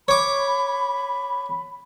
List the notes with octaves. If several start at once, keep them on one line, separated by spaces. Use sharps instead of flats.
C#5 B5 D6